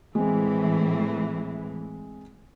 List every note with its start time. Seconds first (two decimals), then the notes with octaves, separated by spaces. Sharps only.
0.15 A2 E3 G#3 C4